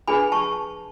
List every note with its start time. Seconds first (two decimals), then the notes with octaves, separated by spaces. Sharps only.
0.08 D4 G#4 B4 G#5 B5
0.32 A5 C#6